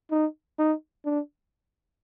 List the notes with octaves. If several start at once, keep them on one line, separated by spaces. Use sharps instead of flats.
D#4
D#4
D4